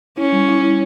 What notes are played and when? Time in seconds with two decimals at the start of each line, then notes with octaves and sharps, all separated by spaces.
0.18 C#4 E4
0.32 G3
0.48 E4
0.63 E4